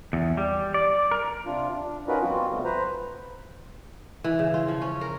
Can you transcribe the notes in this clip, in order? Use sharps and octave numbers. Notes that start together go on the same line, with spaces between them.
E2
G3
D5
A#4
C3 D4 F4
D4
C#4 D#4 F4 F#4 A#4 B4
F3 G3 B3 C4 F4 F#4
C3 F3 G3 A3 B3
B4 C5 A#5
E3
C#3
F4
F3
C#4
A#4